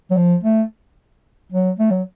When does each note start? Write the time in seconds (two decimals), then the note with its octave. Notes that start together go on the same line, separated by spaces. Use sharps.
0.11 F#3
0.17 F3
0.44 A3
1.52 F#3
1.79 A3
1.91 F#3